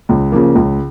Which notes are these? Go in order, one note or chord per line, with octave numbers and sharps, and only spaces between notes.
C#2
C#3 F3 A#3
C#2